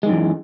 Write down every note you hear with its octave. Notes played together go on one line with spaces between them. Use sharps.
F#2 D#3 E3 G#3